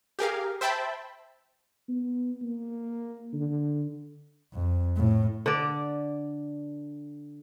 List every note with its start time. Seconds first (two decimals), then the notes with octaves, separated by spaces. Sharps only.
0.19 G4 G#4 A#4 F5
0.61 C5 E5 G5 A5 B5
1.89 B3
2.43 A#3
3.33 D3
4.53 F2
4.96 A2
5.46 D3 D5